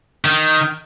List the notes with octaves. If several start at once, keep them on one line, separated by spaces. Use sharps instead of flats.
D#3